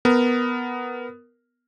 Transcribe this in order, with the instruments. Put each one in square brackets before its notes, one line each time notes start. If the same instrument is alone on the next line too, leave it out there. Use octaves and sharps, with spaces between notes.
[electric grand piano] B3 A#4